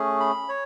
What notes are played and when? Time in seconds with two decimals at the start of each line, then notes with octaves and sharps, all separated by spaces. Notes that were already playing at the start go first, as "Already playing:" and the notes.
Already playing: A3 C#4 G#4
0.20 B5
0.49 C#5